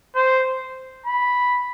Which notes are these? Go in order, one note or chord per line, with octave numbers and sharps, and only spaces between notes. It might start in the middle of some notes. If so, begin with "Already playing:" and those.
C5
B5